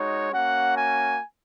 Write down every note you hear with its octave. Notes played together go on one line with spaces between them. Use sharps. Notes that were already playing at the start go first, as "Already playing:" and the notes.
Already playing: G#3 D#4 F#4 C#5
A#3 C#4 F#4 F#5
G#5